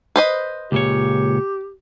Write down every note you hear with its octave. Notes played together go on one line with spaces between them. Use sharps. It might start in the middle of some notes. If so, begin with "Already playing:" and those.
B4 C5 D#5
C#2 A#2 G4 C#5